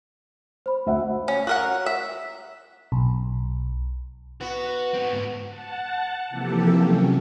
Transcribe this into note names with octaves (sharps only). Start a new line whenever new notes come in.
C5 B5
D2 E5 F#5
C#4
F#4 A#4 F#5
E5
B1
B3 F#4
C4 F#4
G#2 B3
F#5 A5
C3 E3 F3 A#3 G4 A4
C3 F#3 C#4